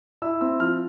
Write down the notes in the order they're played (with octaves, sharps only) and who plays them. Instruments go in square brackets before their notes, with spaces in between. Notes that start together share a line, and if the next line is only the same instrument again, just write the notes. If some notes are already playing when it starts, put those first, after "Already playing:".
[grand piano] E4 E6
C4 E6
F3 F6